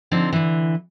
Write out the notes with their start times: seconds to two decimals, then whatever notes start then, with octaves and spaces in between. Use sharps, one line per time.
0.11 D3 F3 C4 D#4
0.33 D3 E3